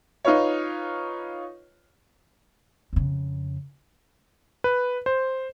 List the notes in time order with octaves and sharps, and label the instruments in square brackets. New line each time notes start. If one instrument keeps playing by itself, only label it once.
[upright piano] D#4 F4 B4 C#5
[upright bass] F2 C#3
[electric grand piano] B4
C5